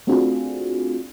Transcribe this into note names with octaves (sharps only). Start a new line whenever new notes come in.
A3 C4 D4 F4 F#4 G#4